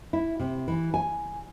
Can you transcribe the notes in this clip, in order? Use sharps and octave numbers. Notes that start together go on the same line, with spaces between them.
E4
C3
E3
G#5